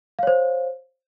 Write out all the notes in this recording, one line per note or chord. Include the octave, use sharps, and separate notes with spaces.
C5 C#5 F5